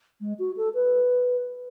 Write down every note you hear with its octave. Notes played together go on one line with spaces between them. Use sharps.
G#3
F#4
A4
B4